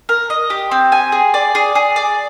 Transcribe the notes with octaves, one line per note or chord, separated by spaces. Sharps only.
A#4
D#5
G4
C4
G#5
G#4
D5
G#4
G#4
D5